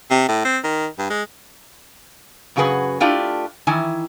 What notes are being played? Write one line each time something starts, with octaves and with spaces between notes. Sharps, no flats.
C3
A2
C4
D#3
G2
G#3
F#2 C#3 F#4 G#4 B4 G#5
A3 D4 E4 F4 G4
D#3 E3 E4 G#5